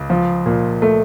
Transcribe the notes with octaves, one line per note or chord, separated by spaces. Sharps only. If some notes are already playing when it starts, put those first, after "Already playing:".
Already playing: C#2
F3
A#2
A3